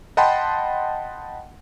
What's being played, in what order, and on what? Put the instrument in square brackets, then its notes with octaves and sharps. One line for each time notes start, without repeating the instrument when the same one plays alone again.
[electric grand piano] D#5 F#5 G5 A5 B5 C6